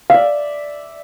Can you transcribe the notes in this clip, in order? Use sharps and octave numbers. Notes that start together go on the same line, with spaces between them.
D5 E5 F5